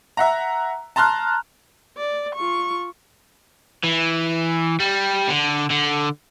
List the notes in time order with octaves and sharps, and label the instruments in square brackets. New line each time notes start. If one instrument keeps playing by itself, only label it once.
[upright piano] E5 F#5 A#5
A5 A#5 C6 F6 F#6
[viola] D5
F4 C#6
[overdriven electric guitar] E3
G3
D3
D3